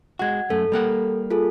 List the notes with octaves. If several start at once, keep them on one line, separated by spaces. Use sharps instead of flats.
G#3 F#4 F#5 G#6
F#2 A3 A4
G3 A#3 F#5
F4 G#4 A4